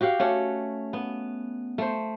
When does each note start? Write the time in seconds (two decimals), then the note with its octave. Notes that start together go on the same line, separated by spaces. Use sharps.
0.01 F#4 G4 F5 F#5
0.20 A3 C#4 F#5
0.93 B3
1.78 A3 C5